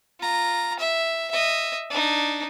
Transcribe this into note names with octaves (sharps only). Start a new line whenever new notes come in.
F4 A#5
E5
D#5 E5
D4 D#4